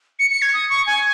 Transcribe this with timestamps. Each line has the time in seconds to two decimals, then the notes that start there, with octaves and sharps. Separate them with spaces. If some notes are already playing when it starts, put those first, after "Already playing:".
0.19 C#7
0.30 C#7
0.42 G#6
0.54 D#6
0.70 C#6
0.87 G#5